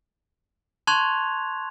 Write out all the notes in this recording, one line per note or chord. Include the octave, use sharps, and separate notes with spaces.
A5 C6 C#6 F#6 G#6 F7